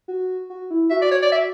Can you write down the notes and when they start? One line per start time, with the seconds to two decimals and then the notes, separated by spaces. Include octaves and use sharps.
0.08 F#4
0.50 F#4
0.70 E4
0.91 F#4 E5
1.02 D5
1.11 C#5
1.23 D5
1.32 E5